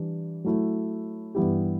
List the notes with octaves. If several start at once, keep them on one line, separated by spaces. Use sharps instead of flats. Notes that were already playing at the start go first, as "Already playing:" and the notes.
Already playing: E3 G3 D4
F#3 A3 E4
G2 E3 B3 E4 G4